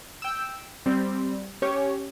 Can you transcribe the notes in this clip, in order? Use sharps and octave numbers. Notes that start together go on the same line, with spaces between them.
G5 E6
G3 C4
C#4 G4 C#5